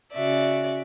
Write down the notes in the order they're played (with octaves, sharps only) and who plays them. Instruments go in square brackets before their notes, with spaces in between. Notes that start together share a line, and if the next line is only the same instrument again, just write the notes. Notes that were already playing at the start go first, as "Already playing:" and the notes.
[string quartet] C#3 F#4 D5 E5